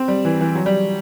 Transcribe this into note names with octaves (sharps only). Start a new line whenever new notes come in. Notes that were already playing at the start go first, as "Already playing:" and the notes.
Already playing: C4
G3
E3
E3
F#3
G3